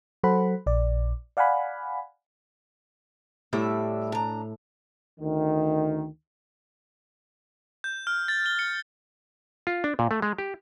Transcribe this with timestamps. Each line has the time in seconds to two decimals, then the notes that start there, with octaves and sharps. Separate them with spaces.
0.24 F#3 A4 C5 F#5 B5
0.66 A#1 D5
1.37 D5 F5 F#5 G#5 B5
3.53 A2 G3 D4 E5
4.12 D4 A#5
5.19 D2 D#3
7.84 G6
8.07 F6
8.28 A6
8.46 G7
8.59 C#7
9.67 F4
9.84 D4
9.99 A#2
10.11 A3
10.22 G#3
10.38 G4